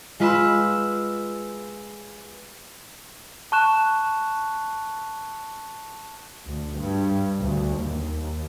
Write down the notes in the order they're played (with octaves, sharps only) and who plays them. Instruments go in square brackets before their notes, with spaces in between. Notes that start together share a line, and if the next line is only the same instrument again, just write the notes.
[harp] G#3 F4 B4 B5 E6
[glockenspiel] A5 C#6 F#6 E7
[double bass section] D2
G2
D2
D#2